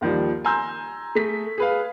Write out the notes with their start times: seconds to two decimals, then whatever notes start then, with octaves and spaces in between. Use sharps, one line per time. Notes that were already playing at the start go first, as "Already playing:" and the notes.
0.01 D#2 D#3 F3 G3
0.45 G#5 A#5 C6 E6 G6
1.15 A3 G#4 B6
1.58 G#4 B4 F5